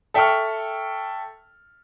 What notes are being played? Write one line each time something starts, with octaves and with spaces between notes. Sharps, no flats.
A4 E5 G5 A5 C#6 F6